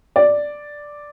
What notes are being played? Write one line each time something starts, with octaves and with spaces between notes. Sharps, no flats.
D5